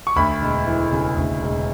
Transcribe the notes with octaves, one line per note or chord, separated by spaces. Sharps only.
C#6
D2 B5
E1
E3
C#3
D2
E1